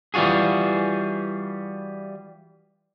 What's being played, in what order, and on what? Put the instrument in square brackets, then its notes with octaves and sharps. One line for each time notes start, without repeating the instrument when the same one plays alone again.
[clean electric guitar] E3 G3 F4 F#4 G#4